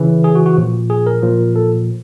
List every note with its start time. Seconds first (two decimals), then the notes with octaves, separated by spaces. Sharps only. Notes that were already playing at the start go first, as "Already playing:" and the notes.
Already playing: C#3 E3
0.24 G#4
0.35 F#4
0.46 F#4
0.57 A#2 F3
0.90 G#4
1.07 A#4
1.23 A#2 F3
1.56 A4